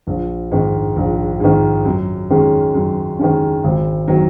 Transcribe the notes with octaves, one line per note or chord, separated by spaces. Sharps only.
A#1
G#2 D#3
A#1
G#2 D#3
F#2
D#3 G#3 C#4
F#2
D#3 G#3 C#4
G#1
D#3 F#3